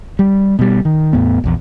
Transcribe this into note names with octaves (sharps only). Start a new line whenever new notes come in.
G3
B2 G3
D#3
E2 A2 B3
A#1 E2